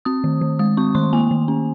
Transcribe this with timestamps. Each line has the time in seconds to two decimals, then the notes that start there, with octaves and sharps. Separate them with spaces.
0.05 C4 D#6
0.24 D#3
0.41 D#3
0.59 G#3 D#6
0.77 C4 C#6
0.95 D#3 C6
1.13 A#3 G#5
1.31 D#3
1.48 C#4